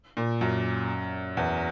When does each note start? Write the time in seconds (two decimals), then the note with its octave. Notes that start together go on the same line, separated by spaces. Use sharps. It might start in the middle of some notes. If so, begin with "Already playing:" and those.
0.17 A#2
0.41 F#2
1.37 E2